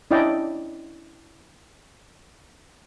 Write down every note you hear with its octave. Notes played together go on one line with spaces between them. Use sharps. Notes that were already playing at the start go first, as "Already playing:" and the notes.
C#4 D4 E4 D5 D#5 G5